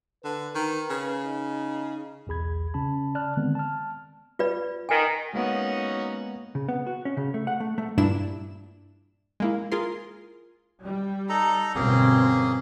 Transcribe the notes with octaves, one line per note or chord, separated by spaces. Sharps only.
D3 B4
D#3
C#3
D#4
B1 E2 G#4 B5 G#6
C#3 C#4 A5 B5
D5 A5 F6 F#6
D3 D#3 G#3 B3 C4
A5 F6
F4 B4 D5
D#3 G#5
G#3 A#3 B3 C#4 D#4 F#4
C#3
B3
F#4
C#4
C#3
A3
F#5
A3
A3
G2 A#2 D4 E4 E7
G#3 A#3 E4
F4 G#4 A#4 C6
G3
D#4 A4 A#5
G1 B2 A#3 C4 C#4 G#4